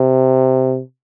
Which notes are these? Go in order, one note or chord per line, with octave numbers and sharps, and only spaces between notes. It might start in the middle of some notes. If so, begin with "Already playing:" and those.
Already playing: C3